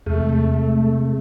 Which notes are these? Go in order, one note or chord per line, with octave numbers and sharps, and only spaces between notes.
E2 C3 G#3 A3